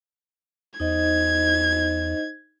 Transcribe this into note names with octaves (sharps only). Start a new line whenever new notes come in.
E2 D#4 C5 D#5 G#6